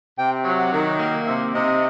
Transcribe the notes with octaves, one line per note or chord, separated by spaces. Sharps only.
C3 G5
F#3
F#5
D#3
A#3
C3 E5
C3 D#5